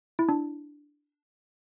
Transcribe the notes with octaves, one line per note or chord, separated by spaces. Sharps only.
E4
D4